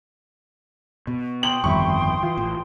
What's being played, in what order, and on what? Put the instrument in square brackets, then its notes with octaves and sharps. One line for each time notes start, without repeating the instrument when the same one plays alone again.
[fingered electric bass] B2
[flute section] G5 C6 D#6 [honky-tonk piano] F#7
[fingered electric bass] G1 F2 D#3 [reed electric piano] G3 E5 B5 [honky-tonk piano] C#6
[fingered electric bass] E3 [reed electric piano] F4
[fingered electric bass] A1